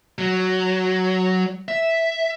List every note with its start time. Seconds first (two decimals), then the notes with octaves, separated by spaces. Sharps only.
0.19 F#3
1.68 E5